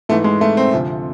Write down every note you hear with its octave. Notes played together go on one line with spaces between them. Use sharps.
G#2 E3 A3
G#3
A3
C4
D2 C3 F3